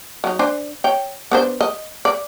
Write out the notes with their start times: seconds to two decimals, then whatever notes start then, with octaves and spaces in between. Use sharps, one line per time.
0.24 F#3 D#4
0.39 D4 C5 G#5
0.84 C#5 G5
1.31 B3 D4 C5
1.61 D#5
2.05 D5